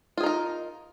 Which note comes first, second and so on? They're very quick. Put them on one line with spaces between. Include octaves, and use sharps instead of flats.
F4 G#4 D#4 A#4